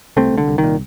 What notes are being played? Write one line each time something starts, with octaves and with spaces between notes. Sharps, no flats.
C2 A3 C4
C2
D3
C2
D#3
A#2